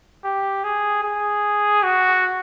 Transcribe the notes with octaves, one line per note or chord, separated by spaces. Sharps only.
G4
G#4
G#4
F#4